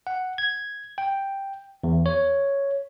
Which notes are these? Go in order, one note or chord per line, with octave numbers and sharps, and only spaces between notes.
F#5
G#6
G5
E2
C#5